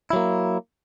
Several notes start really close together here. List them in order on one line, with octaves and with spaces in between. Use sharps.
E4 F#3 A#3